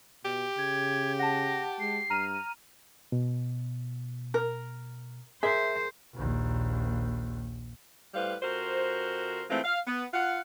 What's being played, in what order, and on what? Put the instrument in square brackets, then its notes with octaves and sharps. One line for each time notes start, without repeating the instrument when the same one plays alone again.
[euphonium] B2 [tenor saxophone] G4
[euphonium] C#3 [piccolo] G#6
[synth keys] F#5 A5 [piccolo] A#6
[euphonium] G#3 [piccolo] C7
[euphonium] G2 [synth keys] A#5 F6 D#7
[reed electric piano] B2
[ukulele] A#4
[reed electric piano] G#4 A#4 [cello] C5 [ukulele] E5
[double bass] A#1 D#2
[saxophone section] A2 G3 B4 C5 F5
F2 F#4 A#4 C5
E3 G#3 A3 C4 F4
F5
B3
F4 F5 F#5